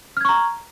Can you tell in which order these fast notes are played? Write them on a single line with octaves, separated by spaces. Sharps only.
F6 G#6 C#6 A#5